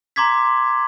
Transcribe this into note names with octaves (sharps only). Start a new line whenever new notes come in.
A#5 C6 D6 G#6 B6